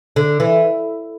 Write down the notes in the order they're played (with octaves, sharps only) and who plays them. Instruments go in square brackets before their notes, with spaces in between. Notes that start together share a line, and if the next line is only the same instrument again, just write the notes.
[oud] D3
E3